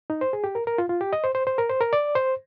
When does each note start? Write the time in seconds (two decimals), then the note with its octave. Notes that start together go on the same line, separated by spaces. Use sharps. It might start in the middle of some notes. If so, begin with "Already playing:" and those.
0.10 D#4
0.21 C5
0.33 G#4
0.44 G4
0.55 A#4
0.67 A#4
0.78 F4
0.89 F4
1.01 G4
1.13 D#5
1.24 C5
1.35 C5
1.47 C5
1.58 A#4
1.70 C5
1.81 A#4
1.93 D5
2.15 C5